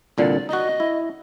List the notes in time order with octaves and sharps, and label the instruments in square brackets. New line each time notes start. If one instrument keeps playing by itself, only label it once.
[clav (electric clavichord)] C2 A#2 D3 [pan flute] D5
[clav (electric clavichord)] D#4 F#4 [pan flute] D#5
[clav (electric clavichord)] E4